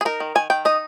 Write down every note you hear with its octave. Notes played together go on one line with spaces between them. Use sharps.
G#4
D#4 A#4
D#3
D#3 G#5
D#3 G5
D#4 D#5